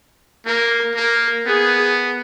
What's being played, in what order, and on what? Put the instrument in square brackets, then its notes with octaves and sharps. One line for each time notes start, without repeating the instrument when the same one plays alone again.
[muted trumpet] A#3 [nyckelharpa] A#4
[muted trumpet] A#3 [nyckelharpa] A#4
[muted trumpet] B3 [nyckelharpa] G#4